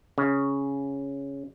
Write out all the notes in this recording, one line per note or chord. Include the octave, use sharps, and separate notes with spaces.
C#3